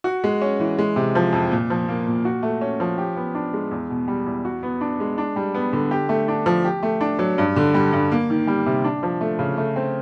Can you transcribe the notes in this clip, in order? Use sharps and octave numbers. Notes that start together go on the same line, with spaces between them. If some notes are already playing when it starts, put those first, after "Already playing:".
F#4
G#3
C#4
E3
G#3
C3
F3
F2
A#2
F3
A#3
A#2
F#4
A3
C#4
F3
G4
B3
D4
G#3
E2
B2
G3
E2
F#4
B3
D4
G#3
D4
G3
B3
D3
G4
A3
D4
F3
G4
A3
D4
F#3
G2
D3
G3
G2
A#3
D#3
G3
C3
D4
F3
A3
C#3
A3
C4